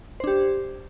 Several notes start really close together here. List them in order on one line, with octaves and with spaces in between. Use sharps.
C5 D4 G4